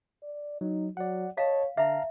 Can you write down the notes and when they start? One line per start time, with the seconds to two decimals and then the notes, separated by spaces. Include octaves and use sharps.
0.23 D5
0.61 F#3 D#4
0.97 F#3 D5 F#5
1.37 C#5 D#5 F5 A5
1.77 D3 E5 F5 A5 A#5